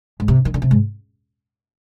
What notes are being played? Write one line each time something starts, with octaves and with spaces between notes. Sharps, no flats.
G#2
C3
D#3
D3
C3
G#2